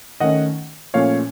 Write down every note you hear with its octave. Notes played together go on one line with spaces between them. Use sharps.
D#3 A3 C#4 D#5 F#5
A#2 F3 A3 C#4 C#5 F5